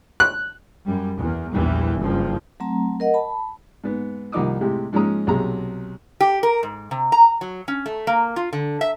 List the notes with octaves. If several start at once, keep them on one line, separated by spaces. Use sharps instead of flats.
F#6
F#2 G3
E2
A#1 E2 E3 G3
F#1 G2 F3
F#3 A3 C4 A#5
A#4 D#5 F#5
A5 B5
G#2 B3
C2 D#3 F3 D#4 D6 D#6
A2 C3 G#3 G4
G#2 F3 G#3 C#4 A#5 D#6
B1 C3 G#4 A#5
G4
A#4
G#2
C3
A#5
F#3
C#4
A3
A#3
F4
D3
E5